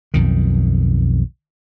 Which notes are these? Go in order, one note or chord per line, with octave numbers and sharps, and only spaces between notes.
B1 F2 D#3